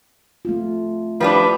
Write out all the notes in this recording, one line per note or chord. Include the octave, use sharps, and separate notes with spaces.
A3 C4 F4
F3 G3 D4 E4 F4 B4